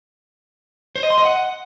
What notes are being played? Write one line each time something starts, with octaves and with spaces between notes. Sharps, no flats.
C5
D#5
C6
D#5
F#5